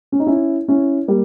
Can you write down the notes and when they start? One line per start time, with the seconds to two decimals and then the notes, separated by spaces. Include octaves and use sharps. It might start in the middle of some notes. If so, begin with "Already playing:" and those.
0.12 C#4
0.20 D#4
0.27 C#4 E4
0.68 C#4 E4
1.08 G3 A#3